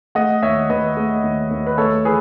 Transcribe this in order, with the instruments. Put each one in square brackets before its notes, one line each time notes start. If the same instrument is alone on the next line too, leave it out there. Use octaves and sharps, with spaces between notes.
[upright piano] A3 D#5 F#5
D#2 C#5 E5
D#2 B4 D#5
A3
D#2
D#2
B4
A3 A4 C#5
E3 G#4 B4